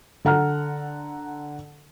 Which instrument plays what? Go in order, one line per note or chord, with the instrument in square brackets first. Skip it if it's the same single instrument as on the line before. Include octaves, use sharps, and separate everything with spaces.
[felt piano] D3 A4 F#5 A#5 F6